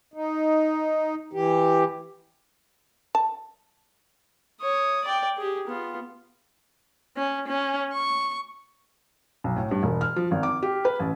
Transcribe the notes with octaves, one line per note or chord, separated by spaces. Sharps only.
D#4
E3 G4
A5
C#5 D#6
D5 G5
G4 G#4
B3 F4
C#4
C#4
C#6
B1
A2
G2
E1
F6
F3
G#1
D6
G4
B4
A1